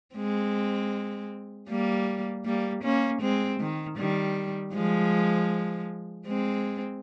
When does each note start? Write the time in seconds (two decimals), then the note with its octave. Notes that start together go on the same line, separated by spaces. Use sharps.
0.16 G#3 C4
1.69 G3 A#3
2.45 G3 A#3
2.83 A#3 C#4
3.22 G#3 C4
3.60 D#3
3.98 D#3 G3
4.74 F3 G#3
6.27 G#3 C4